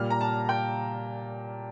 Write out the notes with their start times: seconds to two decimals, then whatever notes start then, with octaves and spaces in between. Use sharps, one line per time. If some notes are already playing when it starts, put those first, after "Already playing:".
Already playing: A#2 G3 F6
0.10 A#5
0.21 A5
0.49 G5